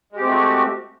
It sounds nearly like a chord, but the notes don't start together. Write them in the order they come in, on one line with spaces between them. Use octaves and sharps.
G#3 G4 C4 A3 F#4